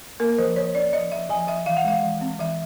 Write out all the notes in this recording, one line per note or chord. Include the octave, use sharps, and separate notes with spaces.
A#3 A#4
F3 C5
F3 C#5
C#4 D5
F3 D#5
F3 E5
F3 G#5
F3 E5
E3 F5
F#5
G#3 F5
E3
C4
E3 E5